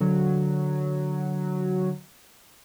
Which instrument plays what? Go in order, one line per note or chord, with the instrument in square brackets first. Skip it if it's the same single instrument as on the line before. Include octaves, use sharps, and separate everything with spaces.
[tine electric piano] D3 [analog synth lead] F#3